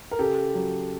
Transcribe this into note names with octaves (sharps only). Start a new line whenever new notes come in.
A#4
C#3 G4 A4
F#3